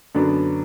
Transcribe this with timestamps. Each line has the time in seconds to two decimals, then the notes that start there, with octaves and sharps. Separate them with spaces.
0.14 F#2 D3 F#3 B3 D4